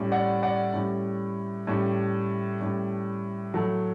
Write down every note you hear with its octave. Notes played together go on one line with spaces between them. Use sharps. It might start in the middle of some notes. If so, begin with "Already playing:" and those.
Already playing: A2 G3 C#4
D5 F#5
D5 F#5
A2 G3 C#4
A2 G3 C#4
A2 G3 C#4
A2 F#3 A3